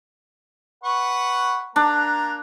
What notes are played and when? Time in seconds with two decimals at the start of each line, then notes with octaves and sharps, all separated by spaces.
0.84 B4 F#5 C#6
1.76 A#3 D4 A#5